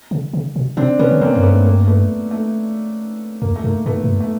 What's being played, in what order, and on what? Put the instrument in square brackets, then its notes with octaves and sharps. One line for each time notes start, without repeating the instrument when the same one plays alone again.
[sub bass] C#3
C#3
B2
[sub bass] B2 [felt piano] C4 D4
[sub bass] C3 [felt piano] B3 C#4
[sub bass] D3
[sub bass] C#3 [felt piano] A#3 C4
[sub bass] F#2 [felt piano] A#3
[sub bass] G2 [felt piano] A3 B3
[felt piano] A#3
A3 B3
A3
[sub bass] F2 [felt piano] A#3
[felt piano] A3
[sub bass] G2 [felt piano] A#3
[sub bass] G#2 [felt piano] A3 B3
[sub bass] G#2
G2
[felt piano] A3